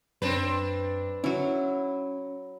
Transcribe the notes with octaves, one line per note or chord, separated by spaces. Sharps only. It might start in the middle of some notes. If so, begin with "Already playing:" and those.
F#2 C4 D4 B4
F#3 C#4 E4